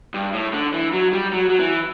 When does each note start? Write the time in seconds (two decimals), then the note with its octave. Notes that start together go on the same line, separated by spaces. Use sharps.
0.14 G2
0.33 A2
0.53 D3
0.74 E3
0.93 F#3
1.13 G3
1.33 F#3
1.50 F#3
1.60 E3